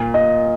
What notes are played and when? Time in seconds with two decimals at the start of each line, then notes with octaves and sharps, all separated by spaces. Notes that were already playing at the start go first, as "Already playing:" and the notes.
Already playing: A#2
0.14 D#5